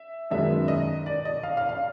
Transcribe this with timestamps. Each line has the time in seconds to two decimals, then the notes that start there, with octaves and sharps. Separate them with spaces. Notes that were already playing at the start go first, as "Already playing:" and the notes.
Already playing: E5
0.30 F#2 D#3 G#3 B3 E5
0.68 D#5
1.06 D5
1.25 D#5
1.43 F5
1.57 F5
1.69 F5